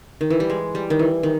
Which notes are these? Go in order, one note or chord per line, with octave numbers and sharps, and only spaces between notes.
D#3
E3
G3
G#3
G3
D#3
E3
D#3